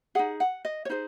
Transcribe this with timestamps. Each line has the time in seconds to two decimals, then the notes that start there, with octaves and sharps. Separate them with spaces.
0.15 D#4 G#4 F#5
0.40 F#5
0.65 D#5
0.85 C#5
0.89 D#4 G#4 C5